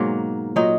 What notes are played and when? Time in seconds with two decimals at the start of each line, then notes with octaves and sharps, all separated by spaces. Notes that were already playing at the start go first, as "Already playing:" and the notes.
Already playing: G#2 B2 F#3 A#3
0.56 A#2 F#3 D#4